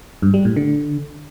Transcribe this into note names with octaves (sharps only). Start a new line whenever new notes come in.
G2
G3
A2
D3